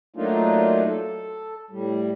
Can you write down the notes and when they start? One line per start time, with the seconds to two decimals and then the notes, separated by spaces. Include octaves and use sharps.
0.16 F#3 A3 A#3 D4 D#4 F4
0.88 A4
1.70 A2 G3